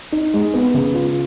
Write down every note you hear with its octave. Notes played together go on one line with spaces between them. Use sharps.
D#4
G#3
B3
C#3
F4